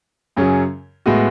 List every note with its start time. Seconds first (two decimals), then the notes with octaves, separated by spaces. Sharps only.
0.36 F#2 C#3 F#3 C#4 G#4
1.06 A2 G#3 B3 F#4